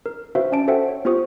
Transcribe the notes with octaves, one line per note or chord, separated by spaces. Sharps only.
A#4
F#4 B4 C5 E5 F5
C#4 D5 A5 D7
F#4 A4 C5 E5 F#5 G5
C#5
B3 F4 G4 C5 C#6 D#6